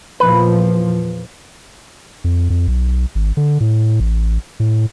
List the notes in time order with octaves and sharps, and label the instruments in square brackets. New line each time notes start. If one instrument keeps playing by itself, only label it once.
[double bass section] E2 A#2 F3 [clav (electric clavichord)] B4
[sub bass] F2
F2
B1
G#1
D3
A2
A1
A2